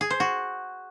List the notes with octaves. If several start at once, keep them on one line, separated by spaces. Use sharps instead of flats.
G#4
C5
F#4